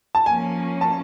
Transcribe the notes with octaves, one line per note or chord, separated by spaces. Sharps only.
A5
F3 A#3 C#4 G#5
A5